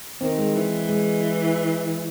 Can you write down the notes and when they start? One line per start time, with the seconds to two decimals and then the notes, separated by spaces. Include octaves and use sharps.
0.21 D#3 C4
0.38 G#3
0.55 E3
0.89 G#3